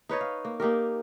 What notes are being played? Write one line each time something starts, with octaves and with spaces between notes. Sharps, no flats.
D#4 B4 C#5 D#5
F5
A#3
A#3 D#4 G4 A#4